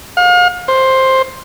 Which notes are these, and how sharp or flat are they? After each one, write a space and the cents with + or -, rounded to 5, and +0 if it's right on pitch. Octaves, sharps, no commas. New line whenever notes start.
F5 +40
C5 +10